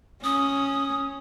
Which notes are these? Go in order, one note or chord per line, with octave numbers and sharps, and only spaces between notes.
C#4 D#6